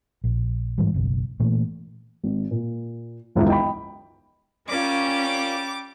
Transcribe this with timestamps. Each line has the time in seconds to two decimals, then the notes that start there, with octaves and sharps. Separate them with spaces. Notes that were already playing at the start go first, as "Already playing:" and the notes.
0.24 A#1
0.78 G#2 E3 G3
0.94 F#1 B1
1.40 A#2 E3 A3
2.23 G#1
2.51 A#2
3.35 E1 C#2 F#2 D#3 E4
3.48 D#5 G5 B5
4.69 G3 C#4 F4 A#4 D5 D6